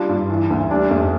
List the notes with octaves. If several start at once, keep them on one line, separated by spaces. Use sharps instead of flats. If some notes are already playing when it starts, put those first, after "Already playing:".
Already playing: G3 D4 F4
G2
E3
D2
G3 D4
F2